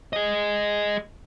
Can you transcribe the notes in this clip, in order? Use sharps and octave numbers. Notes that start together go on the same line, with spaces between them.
G#4 D#5